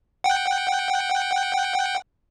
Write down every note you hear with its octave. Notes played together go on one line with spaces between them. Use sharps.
F#5 G5